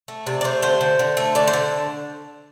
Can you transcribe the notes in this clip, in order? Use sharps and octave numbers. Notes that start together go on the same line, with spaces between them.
A3
C3 D5
D5
A3 C5
D3 C5
D3
D3
A3
D3 D5
C5
D3